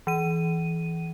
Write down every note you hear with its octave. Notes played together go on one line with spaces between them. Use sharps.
E3 D#7